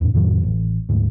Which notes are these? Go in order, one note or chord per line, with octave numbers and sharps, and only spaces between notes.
E2 A2
F2 A2 D#3 F#3
A1
D2 G#2